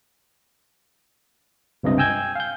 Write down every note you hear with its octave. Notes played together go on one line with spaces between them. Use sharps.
C#2 G2 C3 D#5
G5 G#5 E6 G6 G#6
F5 G6